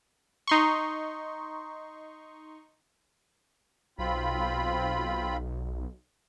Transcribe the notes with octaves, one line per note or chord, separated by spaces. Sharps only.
D#4 C6 C#6
B1 C4 F4 B5